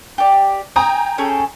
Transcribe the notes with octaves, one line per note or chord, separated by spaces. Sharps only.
G4 D5
G5 G#5 A#5 D#6
C#4 G#4 A4